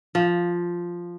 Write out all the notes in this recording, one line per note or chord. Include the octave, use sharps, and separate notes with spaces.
F3